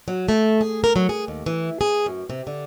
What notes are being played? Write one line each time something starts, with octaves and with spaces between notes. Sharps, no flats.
F#3
A3
G#4
A#4
F#3
G#4
D#2
E3
G#4
F#2
C3
D3